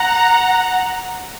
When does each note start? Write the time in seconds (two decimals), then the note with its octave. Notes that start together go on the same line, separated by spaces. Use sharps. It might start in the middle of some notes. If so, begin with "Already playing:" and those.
Already playing: F#5 A#5